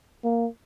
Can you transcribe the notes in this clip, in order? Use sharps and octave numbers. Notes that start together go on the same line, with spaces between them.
A#3